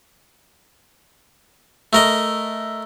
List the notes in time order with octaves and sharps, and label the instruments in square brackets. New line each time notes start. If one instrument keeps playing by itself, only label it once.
[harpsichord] A3 A#4 D#5